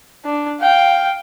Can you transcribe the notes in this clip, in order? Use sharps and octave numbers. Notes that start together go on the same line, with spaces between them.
D4
F5 G5